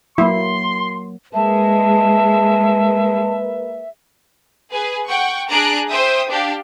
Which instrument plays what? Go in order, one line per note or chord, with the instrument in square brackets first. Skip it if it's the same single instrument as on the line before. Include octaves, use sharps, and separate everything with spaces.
[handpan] F#3 A#3 [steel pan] E4 [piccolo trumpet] C6
[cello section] G#3 [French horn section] A#3 A#4 B4 [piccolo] E5 [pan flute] A5
[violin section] G#4 B4 G#5
F#5 G5 C#6
D4 G#4 A#5 F#6 D7
C5 E5 G5 D#6
D4 G4 F5